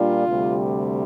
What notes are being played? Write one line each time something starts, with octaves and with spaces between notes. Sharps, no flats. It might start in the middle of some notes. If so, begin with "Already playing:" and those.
Already playing: A#2 G3 D4 F4
D2 C3 G3